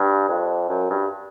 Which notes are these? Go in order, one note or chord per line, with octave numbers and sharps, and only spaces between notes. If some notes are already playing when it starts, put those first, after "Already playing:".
Already playing: G2
F2
F#2
G2